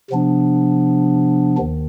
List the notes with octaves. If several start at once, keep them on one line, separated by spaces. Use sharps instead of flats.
C3 F3 B3 D4
D#2 D#3